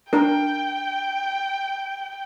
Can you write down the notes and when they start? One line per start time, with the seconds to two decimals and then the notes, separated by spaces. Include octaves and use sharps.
0.13 D4 A#4 G5